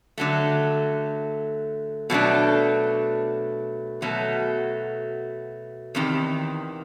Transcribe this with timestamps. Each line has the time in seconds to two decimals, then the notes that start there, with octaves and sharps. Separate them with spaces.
0.18 D3 F#3 A3
2.10 B2 F#3 A3 D4
4.02 B2 F#3 A3
5.95 E2 C3 D#3